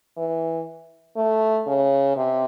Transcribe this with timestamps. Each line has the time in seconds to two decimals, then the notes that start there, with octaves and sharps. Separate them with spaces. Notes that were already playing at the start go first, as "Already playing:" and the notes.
0.18 E3
1.17 A3
1.67 C#3
2.16 C3